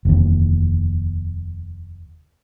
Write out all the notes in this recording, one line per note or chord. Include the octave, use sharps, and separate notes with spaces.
F1 D#2